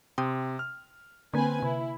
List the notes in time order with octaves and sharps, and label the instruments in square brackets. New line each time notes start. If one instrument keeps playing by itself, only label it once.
[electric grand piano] C3 [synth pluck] G5 C6 D#6
[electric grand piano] F6
[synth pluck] D3 A#3 [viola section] C4 B4 G#5
[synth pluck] C3 [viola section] E4